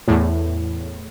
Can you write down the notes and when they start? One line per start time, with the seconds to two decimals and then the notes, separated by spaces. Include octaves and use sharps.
0.08 E2 A2